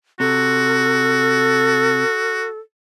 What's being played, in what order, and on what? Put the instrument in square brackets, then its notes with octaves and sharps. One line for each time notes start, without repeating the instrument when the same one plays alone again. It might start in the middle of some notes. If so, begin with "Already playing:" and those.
[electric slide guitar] C3 [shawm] F#4 [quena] A4